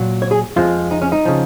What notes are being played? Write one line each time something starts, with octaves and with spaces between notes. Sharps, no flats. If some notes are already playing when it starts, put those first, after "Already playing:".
Already playing: A#2 F#3
C#5
G#4
F2 F3 G#3 F4
D#4
C#4
D#4
C#3 F3